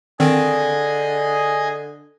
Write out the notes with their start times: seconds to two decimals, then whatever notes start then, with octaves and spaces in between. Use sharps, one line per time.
0.20 D3 D#3 C4 G#4 D#5 G#5